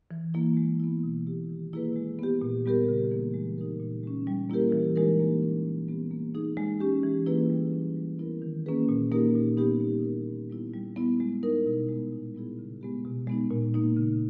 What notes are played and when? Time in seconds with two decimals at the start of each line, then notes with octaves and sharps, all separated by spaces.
0.11 E3
0.34 A#3 E4
0.57 G#3
0.80 B3 E4
1.03 B2
1.26 A#3 E4 G4
1.49 D#3
1.73 A#3 E4 G#4 B4
1.96 G#3
2.19 B3 G4
2.42 A#2
2.66 G3 B3 G4 A#4
2.88 C#3
3.11 E3 A#3 D#4 G#4
3.34 G#3
3.58 D#4 G4 A#4
3.80 A#2
4.04 G#3 C#4
4.27 G3
4.50 A#3 E4 G4 A#4
4.73 E3
4.96 G#3 D#4 G4 A#4
5.20 A#3
5.43 C#4 E4 A#4
5.65 A#2
5.88 G3 B3 G4
6.11 A#3
6.35 D#4 G#4
6.57 G#3
6.80 C#4 G4
7.03 E3
7.26 A#3 E4 G#4 B4
7.50 G3
7.73 A#3 C#4
7.97 G3
8.19 B3 E4 A#4
8.42 D#3
8.66 A#3 C#4 G#4 B4
8.89 A#2
9.12 A#3 D#4 G4 A#4
9.35 A#2
9.57 G3 B3 D#4 G4
9.80 A#3
10.04 E4 A#4
10.28 A#2
10.50 G3 B3 E4
10.73 G3
10.96 B3 E4
11.20 G#3
11.43 D#4 A#4
11.66 B2
11.89 G#3 B3
12.13 A#2
12.35 G3 B3 E4 G#4
12.59 C#3
12.81 G#3 B3 G4
13.05 B2
13.27 G#3 B3 D#4
13.50 A#2
13.74 A#3 D#4
13.96 C#3